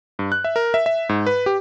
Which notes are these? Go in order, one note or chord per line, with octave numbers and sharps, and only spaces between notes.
G2
F#6
E5
A#4
E5
E5
G#2
B4
G4